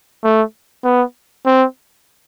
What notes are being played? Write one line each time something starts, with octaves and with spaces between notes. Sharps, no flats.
A3
B3
C4